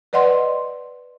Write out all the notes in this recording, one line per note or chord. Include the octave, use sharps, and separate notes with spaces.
B4 D5 D#5 F#5 C6